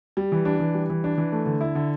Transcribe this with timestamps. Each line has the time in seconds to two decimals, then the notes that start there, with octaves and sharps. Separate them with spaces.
0.17 G3
0.32 E3
0.45 D4
0.60 E3
0.74 G3
0.89 E3
1.04 D4
1.18 E3
1.32 A3
1.46 D3
1.61 E4
1.75 D3